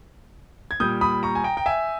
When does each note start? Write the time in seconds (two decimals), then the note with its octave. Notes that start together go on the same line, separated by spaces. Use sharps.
0.71 G#6
0.80 A#2 G3 D#6 G6
1.01 B5 D#6
1.23 A#5 C#6
1.35 G#5
1.44 G5 A#5
1.57 G5
1.66 E5 G#5